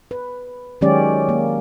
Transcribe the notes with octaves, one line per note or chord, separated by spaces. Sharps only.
B4
D#3 F#3 G#3 C#4 G4 D5
A#3